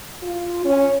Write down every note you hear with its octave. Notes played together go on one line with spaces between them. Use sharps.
F4
C#4